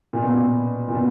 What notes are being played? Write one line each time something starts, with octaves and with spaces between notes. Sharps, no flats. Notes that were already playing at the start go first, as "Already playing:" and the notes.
A#2
B2
A#2
A#2
B2